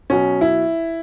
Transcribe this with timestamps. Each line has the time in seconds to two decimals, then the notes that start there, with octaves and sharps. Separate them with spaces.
0.10 B2 F#3 C#4
0.41 E4